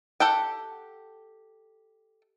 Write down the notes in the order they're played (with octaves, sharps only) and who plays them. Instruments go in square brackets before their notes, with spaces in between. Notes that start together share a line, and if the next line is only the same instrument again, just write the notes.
[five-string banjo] G4 A4 F#5 G5